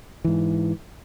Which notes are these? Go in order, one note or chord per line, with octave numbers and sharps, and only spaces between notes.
G#2 E3